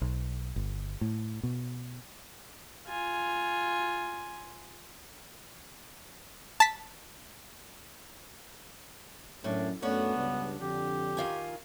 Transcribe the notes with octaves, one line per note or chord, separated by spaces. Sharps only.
B1
G1
A2
B2
F4 G#5
A5 B6
F#2 A2 D4
F#2 A3 B3 C#4 D4 F#4
C#2 G2
F2 D3 G4
D#3 F4 G#5